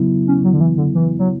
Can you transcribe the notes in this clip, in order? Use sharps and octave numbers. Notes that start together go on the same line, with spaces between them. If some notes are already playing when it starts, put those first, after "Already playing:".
Already playing: C#3 F#3 B3 E4
C#4
F#3
D3
E3
D3
E3
F#3